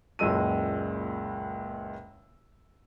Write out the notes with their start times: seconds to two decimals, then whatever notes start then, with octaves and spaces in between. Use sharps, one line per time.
0.19 F#1 C#2 A#2 G#3 E6 D#7